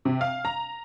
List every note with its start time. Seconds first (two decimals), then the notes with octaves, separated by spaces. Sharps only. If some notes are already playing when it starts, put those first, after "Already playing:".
0.05 C3
0.21 F5
0.45 A#5